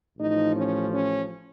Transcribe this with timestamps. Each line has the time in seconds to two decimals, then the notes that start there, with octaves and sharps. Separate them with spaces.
0.18 A1 A2 F3 D#4
0.54 C#4
0.90 C#4